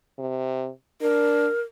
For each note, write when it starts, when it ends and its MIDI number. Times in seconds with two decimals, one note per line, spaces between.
0.18 0.69 48
1.01 1.49 62
1.01 1.61 70